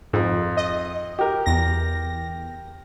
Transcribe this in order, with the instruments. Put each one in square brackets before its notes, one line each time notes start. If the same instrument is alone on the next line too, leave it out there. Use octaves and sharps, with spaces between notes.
[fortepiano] F2 [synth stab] G#2
[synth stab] D#5
[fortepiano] G4 A#4
[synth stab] E2 A#6